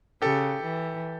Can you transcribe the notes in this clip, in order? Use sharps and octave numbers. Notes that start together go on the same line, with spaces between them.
C#3 G4 A4
E3